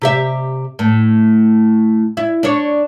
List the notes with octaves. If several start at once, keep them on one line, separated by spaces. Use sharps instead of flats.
C3 G4 E5
A2
E4
D4 C#5